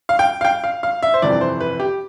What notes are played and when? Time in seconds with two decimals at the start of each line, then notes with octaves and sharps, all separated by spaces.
0.09 F5
0.19 G5
0.41 F5
0.45 G5
0.64 F5
0.83 F5
1.03 E5
1.14 C5
1.22 G1 F2 C3 E3 D5
1.41 C5
1.60 B4
1.80 G4